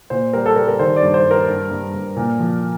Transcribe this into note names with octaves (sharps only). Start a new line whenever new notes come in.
A#2 C5
G3 A#4
A4
G3 A#4
A#4
D#3 C5
D5
G2
C5
G2
A#4
G2
G2
G2
A#2
F3